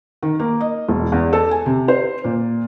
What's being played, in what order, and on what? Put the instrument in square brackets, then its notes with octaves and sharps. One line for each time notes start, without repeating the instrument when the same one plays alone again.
[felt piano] D#3
A#3
D#5
E1
E2
A4
G#5
C3
C5
A#2